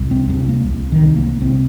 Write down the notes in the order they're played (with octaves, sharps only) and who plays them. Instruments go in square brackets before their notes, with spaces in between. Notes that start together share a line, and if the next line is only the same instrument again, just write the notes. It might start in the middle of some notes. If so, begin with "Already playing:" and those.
Already playing: [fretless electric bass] C2
C4
C2 C4
A#3
C2
D#3
C2
A#3
C2 C4